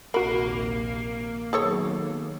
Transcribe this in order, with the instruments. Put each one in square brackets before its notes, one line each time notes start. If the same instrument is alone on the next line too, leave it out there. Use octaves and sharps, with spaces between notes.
[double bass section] A#1 D#2 C3 [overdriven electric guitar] A#3 [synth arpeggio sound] F#4 A#4 [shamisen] B5
[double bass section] D#3 F#3 B3 [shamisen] G#4 A4 C#5